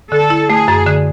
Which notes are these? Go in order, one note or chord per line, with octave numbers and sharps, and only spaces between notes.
D3 A4
E4
A3 G#4
F#2
D3